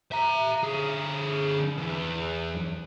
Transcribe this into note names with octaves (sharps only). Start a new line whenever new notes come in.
E5 A#5
D3 G#4
E2